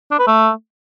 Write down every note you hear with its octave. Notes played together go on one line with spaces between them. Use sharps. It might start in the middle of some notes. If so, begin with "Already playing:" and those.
D4
B4
A3